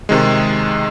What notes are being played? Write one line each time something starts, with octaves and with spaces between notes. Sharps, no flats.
C3 D#3 G#3